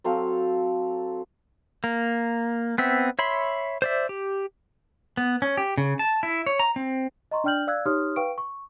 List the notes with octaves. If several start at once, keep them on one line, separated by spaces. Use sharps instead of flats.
F#3 C4 A4 F5
A#3
B3 C4 E5
C#5 E5 B5 C6
C5 D5 E5
G4
B3
C#4
G4
C#3
A5
E4
C#5
A#5
C4
D#5 A#5 C6 C#6
D4 D5 G5 F6 G6 F#7
D5 F5 E6 F#6 G#6
D#4 G4 C#5 C6 D#6 F6
B4 F5 G5 C#6 D7
C#6